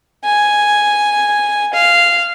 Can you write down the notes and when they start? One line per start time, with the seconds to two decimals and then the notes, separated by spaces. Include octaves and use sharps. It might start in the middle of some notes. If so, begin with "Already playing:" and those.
0.25 G#5
1.74 F5